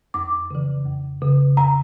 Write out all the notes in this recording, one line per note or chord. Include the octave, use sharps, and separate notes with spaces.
F2 D6
C#3 E3
F2
C#3 E3
F2 A#5